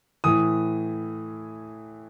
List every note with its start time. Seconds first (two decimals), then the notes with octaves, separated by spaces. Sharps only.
0.24 A2 E3 D#6